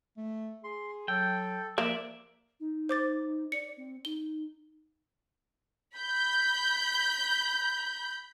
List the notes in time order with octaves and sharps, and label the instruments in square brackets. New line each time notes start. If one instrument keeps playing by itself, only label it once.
[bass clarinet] A3
[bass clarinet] G#4 [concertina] C6
[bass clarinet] F#3 [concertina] A4 [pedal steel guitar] G5
[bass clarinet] F3 [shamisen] A#3 [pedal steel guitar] D5 E5
[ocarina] D#4
[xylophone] C5 D6 A6
[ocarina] D5 [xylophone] C#7
[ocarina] C4
[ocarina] D#4 [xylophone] G7
[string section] B5 G6